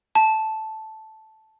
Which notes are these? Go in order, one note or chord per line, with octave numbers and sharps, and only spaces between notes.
A5